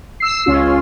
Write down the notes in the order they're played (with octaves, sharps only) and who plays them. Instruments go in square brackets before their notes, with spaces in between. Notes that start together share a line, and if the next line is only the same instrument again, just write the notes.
[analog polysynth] E6 C7
C#2 C#4 F4